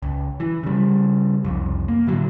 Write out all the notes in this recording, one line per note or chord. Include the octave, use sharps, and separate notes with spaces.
C#2
E3
C#3 G3
C2 F2
A#3
A2 D3 F#3